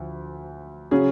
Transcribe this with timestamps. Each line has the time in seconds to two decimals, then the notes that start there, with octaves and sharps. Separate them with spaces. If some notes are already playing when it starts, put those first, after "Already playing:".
Already playing: D2 F3
0.91 C#3 F#3 C#4 G#4